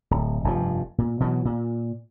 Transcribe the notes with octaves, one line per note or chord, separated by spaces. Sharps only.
D1
F1 G2 C3 F3
A#2
B2 E3 F#3
A#2